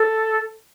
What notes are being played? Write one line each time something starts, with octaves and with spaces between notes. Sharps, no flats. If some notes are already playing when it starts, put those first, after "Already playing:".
Already playing: A4